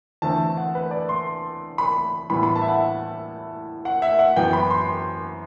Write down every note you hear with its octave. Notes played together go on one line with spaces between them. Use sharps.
E2 D3 A3 C4 A5
F#5
B4
D5
C6
B5
A2 E3 G3 B3 B5
B5
A5
E5
F#5
F#5
E5
F#5
F#2 E3 B3 G5
B5
C6